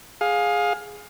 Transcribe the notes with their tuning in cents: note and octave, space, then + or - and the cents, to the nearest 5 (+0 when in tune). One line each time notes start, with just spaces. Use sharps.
G#4 +0 F5 +20